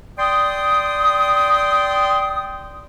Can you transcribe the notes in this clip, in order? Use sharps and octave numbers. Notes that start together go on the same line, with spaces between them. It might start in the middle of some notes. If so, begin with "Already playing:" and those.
D5 G5 C6 D#6